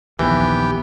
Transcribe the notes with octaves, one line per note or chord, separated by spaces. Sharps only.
A#1 D#2 E3 B3 G4